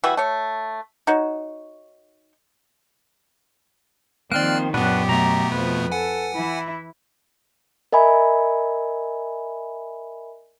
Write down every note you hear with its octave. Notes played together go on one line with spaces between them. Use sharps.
E3 G3 F#4 E5
A3 C#5
D#4 F#4 C#5
D#3 F3 A#3 C4 D5 F6 F#6
F#2 A#2 B3 D4 F#4 G4 B4
B2 A3 B3 A#5
F2 F3 B4
A4 F#5 G#5
E3 E4
A#4 D#5 E5 G#5 B5